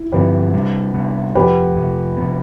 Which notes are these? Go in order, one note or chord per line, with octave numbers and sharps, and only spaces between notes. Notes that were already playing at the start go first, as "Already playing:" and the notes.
Already playing: E4
G2 D3 F3 C4 G4 B4
C3 G3 B3 D4
C3 G3 B3 D4
F2 C3 F3 G4 B4
F2 C3 F3
C3 F3 B3